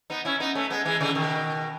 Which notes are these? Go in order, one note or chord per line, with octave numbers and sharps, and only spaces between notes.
B3 D#4
C#4 E4
B3 D#4
A3 C#4
G#3 B3
E3 G#3
C#3 E3
B2 D#3